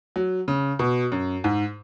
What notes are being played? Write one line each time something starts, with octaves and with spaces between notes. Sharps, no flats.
F#3
C#3
B2
F#2
G#2